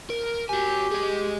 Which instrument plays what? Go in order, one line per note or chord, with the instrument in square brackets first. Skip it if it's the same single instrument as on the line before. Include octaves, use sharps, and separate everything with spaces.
[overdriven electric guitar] A#4
[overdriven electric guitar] F#4 G#5 [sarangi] G4
[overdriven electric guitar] G#4 D#5